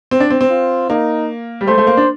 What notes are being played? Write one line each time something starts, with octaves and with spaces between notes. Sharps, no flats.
C4
D4
C4
C4
F4
A#3 D#4
G3
A3 C5
A3
A#3
D4